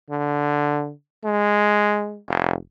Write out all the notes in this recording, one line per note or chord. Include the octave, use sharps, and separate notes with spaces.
D3
G#3
F1